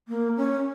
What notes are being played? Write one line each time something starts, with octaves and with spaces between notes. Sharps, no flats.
A#3
C#4